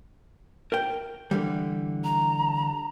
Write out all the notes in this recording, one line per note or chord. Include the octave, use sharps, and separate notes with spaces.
A#4 G5
D3 E3 G3
A#5